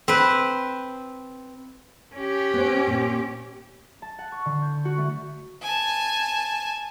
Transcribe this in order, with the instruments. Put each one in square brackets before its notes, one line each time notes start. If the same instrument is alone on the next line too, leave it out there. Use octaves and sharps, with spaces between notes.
[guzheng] C4 B4
[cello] C#4 G4
[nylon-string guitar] B3 C5
A#2
[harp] A5
F#5
C#6
D3
G6
F#4
A3
[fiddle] G#5 A5